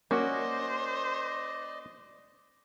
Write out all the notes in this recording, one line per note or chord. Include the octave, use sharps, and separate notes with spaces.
A#3 C#4 F#4 C5 D5 D#5